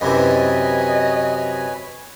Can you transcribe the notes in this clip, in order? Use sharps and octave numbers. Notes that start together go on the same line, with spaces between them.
F#2 C3 E3 B4 C#5 D#5 G#5